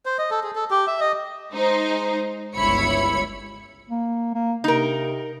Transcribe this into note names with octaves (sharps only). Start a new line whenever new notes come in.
C5
D#5
A4
G#4
A4
G4
E5
D#5
G#3 D#4 C5
G1 C#2 E4 C#5 B5 C#7
A#3
A#3
C3 D#4 A#4